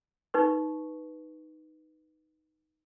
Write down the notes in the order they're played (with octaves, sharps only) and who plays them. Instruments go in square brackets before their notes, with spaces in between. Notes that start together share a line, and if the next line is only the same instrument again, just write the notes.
[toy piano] D#4 B4 C#6